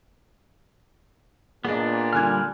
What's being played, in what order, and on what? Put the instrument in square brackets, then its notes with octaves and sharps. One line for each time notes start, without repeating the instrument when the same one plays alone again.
[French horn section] A#2 [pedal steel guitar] B3 D4 [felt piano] G#4 D#5
[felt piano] D3 D4 [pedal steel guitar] G3 F6 [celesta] G#5 F#6 G#6